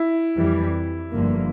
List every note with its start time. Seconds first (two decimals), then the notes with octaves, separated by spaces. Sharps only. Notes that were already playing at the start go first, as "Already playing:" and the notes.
Already playing: E4
0.37 F2 E3 G3
1.12 G1 G2 D3 F3 A#3